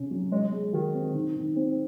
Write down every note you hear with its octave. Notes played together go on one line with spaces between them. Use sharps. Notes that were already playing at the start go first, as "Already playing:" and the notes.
Already playing: C3 C#4
F#3
G#3 C#5
G#3
D#3 F#4
C4
D#3
D#3
C4